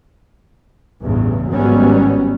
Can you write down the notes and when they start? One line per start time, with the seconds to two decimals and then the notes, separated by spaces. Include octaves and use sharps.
1.02 A1 E2 G2 C#3
1.52 G#1 F#3 G3 B3 C#4